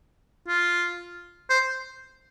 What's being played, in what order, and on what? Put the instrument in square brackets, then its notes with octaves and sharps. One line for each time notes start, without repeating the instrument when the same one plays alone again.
[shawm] F4
C5